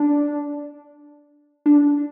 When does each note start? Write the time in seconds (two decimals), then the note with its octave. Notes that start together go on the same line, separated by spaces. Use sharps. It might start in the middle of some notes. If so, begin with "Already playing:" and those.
Already playing: D4
1.66 D4